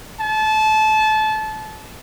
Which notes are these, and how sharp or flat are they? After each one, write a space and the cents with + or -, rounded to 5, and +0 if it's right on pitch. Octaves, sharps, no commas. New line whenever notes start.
A5 -25